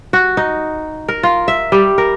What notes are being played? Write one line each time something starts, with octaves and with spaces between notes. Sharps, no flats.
F#4
D#4
A#4
F4
E5
G3
A#4